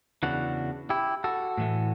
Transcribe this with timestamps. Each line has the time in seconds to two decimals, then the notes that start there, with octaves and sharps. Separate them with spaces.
0.23 E2 C#3 E3 D4 F#4
0.90 E4 G4
1.24 F#4 A4
1.58 A2 E3 A3